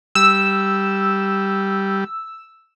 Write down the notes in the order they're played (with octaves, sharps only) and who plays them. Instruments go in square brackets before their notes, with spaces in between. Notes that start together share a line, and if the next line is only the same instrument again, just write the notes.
[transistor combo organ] G3 [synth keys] E6